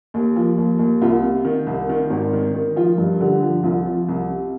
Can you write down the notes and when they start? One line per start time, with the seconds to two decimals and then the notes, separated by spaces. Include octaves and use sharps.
0.14 D#2
0.36 F3
0.57 D#2
0.79 D#2
1.02 C2 F4
1.23 C3
1.45 D#3
1.67 C2
1.89 D#3
2.10 G#1
2.33 D#3
2.54 D#3
2.76 F3 F4
2.98 G2
3.21 D3 G4
3.43 F3
3.63 C2 F4
3.86 F3
4.08 C2
4.30 C3